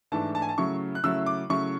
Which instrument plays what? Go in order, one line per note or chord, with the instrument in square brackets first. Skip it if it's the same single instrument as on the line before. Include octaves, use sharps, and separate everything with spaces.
[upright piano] G#2 E3 A3 D4 A5
A5
G#5
A5
C#3 F#3 A3 E4 C#6
F#6
C#3 F#3 A3 E4 E6
D6
C#3 F#3 A3 E4 C#6